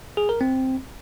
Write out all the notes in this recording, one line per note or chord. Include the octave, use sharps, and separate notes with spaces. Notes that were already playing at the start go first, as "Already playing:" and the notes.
G#4
A#4
C4